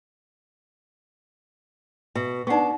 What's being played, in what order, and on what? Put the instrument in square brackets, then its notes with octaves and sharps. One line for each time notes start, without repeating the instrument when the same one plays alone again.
[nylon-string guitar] B2 [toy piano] E5
[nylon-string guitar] B3 D4 [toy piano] D#4 F#5 C#6